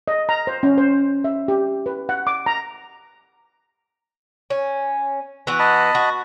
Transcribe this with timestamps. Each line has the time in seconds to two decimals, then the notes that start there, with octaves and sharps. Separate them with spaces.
0.08 D#5
0.29 A#5
0.47 C5
0.63 C#4
0.78 C5
1.24 E5
1.48 G4
1.86 B4
2.09 F#5
2.27 D6
2.46 A#5
4.50 C#4
5.47 E3 B3 F#4
5.59 D#5 A5 B5
5.95 F#4